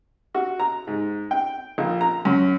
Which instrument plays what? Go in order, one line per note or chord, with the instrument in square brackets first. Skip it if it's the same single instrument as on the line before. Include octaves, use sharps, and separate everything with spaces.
[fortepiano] F#4
A#5
G#2
G5
A#1
A#5
F#2